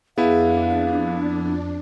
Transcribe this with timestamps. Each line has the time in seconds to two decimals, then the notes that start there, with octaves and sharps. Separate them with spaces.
0.18 F2 B3 D4 E4 G#4 F5